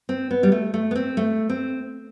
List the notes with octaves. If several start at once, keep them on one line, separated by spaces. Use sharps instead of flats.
C4
B3
G3
A3
A3
B3
C4
A3
C4